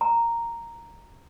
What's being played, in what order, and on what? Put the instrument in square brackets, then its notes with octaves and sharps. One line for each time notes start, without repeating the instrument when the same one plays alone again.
[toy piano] A#5